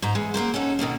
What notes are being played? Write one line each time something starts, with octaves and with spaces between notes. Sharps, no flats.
G#2 C5 A#5
E3 G#3
F#3 A#3 A#4 C5
C#4 D#4 F#4 A4
B2 D3 D#3 A#3